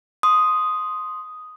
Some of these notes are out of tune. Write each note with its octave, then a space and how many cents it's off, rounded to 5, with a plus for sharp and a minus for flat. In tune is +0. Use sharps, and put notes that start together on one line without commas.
C6 +0 D#6 +0